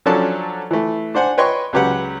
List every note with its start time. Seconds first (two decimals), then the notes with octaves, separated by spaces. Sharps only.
0.06 F3 F#3 C#4 D4 A4 A5
0.71 E3 A3
1.15 D4 C5 F#5 G#5
1.38 B4 C#5 D#5 G5 C6 C#6
1.73 C#2 F#3 G4 B4 F#5